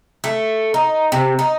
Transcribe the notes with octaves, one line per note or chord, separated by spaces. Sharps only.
A3
D#4
C3
D#4